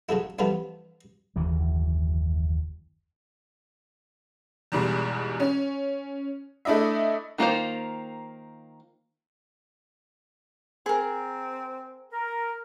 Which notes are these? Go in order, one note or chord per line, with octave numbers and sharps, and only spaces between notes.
C#3 F#3 A3 E4
E3 F3 G3 A3 B3 D4
F#1 D#2 E3 F#3
E2 G#2 B2 G3 G#3
C#4
A3 D4 E4 D#5 E5
D#3 A#3 F4 C5
C4 G#4 A#4
A#4